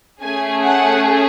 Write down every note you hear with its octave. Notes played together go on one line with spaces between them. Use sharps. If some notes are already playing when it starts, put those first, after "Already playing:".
A3 C#4 G#4 G#5
F#5